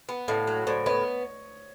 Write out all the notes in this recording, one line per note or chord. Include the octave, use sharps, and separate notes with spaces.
B3
A2 D#5 F5
F#3
A2 C5 D5
B3 C#5 D#5